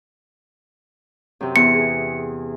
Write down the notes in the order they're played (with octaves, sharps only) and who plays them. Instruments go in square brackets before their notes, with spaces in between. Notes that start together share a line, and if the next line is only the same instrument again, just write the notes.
[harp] F#2 C3
[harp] E2 [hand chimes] C#7
[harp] G#4